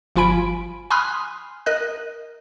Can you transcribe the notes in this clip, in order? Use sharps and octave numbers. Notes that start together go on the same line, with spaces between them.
G1 F3 F4 G#5 B5 D7
G#5 B5 C6 D#6 F6 F#6
A#4 D#5 F#6